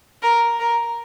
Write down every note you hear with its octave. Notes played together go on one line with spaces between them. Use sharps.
A#4
A#4